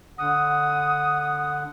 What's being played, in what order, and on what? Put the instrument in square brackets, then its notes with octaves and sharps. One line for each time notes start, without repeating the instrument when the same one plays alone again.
[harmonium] D3 F#5 [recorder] D#6